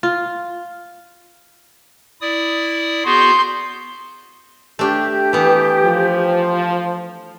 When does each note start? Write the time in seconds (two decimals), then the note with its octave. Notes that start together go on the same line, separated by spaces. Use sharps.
0.03 F4
2.21 E4 D5 D#6
3.05 B3 F#4 G#4 C6 G6
4.79 A3 D4 G4
5.33 E3 B3
5.84 F3